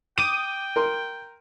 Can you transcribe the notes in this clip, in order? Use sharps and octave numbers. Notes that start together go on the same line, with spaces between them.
G5 D6 D#6 D#7
A#4 C6